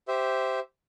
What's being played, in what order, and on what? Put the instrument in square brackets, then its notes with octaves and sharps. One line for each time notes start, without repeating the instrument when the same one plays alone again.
[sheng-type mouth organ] G4 C5 E5